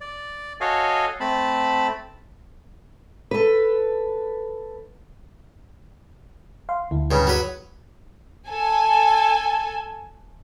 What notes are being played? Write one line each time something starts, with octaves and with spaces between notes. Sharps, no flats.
D5
F#4 A4 C#5 D#5 F5 G#5
A3 C4 A5 B5
A4 B4
F5 C6
D2 E4
G2 C#3
F#3 B4
A4 G#5